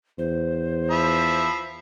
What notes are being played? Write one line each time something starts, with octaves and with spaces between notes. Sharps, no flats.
E2 C5
F3 E5 B5